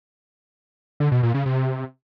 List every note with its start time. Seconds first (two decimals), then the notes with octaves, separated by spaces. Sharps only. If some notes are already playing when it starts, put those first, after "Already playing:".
1.00 D3
1.12 B2
1.23 A#2
1.34 C#3
1.46 C3